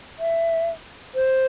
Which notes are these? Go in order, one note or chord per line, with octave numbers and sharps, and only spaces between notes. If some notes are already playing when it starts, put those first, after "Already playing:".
E5
C5